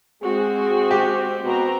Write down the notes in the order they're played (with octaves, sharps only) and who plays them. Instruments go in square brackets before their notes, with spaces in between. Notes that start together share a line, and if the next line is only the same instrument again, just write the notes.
[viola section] G#3 C4 F#4 [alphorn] G#4
[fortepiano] G4
[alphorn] B2 [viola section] C4 F#4 A#5